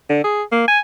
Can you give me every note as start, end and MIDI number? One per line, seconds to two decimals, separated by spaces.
0.10 0.20 50
0.24 0.43 68
0.52 0.66 58
0.68 0.79 80